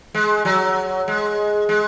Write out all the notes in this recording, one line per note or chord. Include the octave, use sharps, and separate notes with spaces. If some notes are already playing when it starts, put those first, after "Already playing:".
G#3
F#3
G#3
G#3